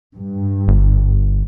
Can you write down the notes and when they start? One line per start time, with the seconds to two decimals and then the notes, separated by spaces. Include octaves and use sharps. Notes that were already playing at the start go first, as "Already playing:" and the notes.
0.14 G2
0.68 G1